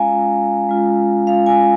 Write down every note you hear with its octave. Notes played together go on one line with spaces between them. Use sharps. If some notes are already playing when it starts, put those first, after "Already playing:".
Already playing: G#3 C#4 F4 F5 G#5 A#5
G#3 C#4 F4
G#3 C#4 F4
G#3 C#4 F4 F5
G#5